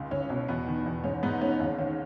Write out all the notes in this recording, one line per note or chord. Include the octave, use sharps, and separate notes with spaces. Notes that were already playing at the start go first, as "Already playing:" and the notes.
Already playing: C#2
C#2 C#4
B2 C#4
E2 B3
D#3
E2
G#2 C#4
G#2 B3 D#4
G#2 C#4
D#2 C#4
D#3 C#4